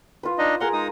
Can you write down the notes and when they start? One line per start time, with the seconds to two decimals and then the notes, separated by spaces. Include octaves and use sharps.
0.23 F4 B4
0.38 D4 D#4 D#5
0.60 G#4 A#4 D#5 F5 F#5 C6
0.73 G#3 D#4 D#6